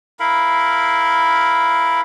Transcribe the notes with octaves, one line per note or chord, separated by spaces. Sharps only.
E4 A#4 F5 B5